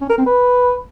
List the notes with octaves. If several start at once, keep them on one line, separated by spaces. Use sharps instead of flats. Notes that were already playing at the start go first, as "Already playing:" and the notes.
C#4
A#4
C4
B4